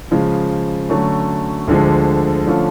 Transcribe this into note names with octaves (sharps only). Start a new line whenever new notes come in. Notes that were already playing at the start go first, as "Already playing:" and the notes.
C#3 F3 G#3
D3 F#3 A3 C#4
D2 D3 F3 G#3
D3 F3 A3 C#4 F4